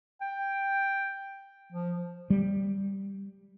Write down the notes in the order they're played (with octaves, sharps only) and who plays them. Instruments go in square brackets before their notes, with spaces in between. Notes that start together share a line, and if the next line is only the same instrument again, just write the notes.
[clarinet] G5
F3
[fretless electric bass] G3